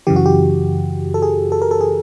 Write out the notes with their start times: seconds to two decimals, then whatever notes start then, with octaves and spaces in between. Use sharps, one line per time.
0.07 F#2 C#3 E3 G4
0.16 F#4
0.26 G4
1.14 A4
1.22 G#4
1.52 A4
1.62 A#4
1.71 A4
1.81 G#4